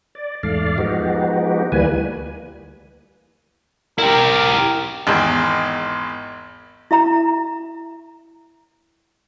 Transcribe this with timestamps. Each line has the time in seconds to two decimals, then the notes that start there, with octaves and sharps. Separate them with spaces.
0.15 D5
0.43 E2 G#2 A3 D5 F5
0.78 F3 G#3 B3 D#4 F#4 G4
1.72 D2 E3 G3 A#3 B4 G#5
3.98 E4 G4 A#4
5.07 G#1 E2
6.91 E4 E5 A#5